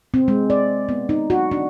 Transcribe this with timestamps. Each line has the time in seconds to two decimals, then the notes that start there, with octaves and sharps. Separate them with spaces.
0.14 C4
0.28 G#3
0.50 D5
0.89 B3
1.09 D#4
1.30 F#4
1.51 D4